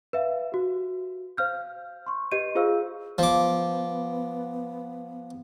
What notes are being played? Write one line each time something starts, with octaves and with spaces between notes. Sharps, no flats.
B4 E5 F5
F#4 G4
C5 F5 F6 G6
C6 C#6
G4 B4 D#5 G6 D#7
F4 G#4 C5 F5 E6
F3 B3 D6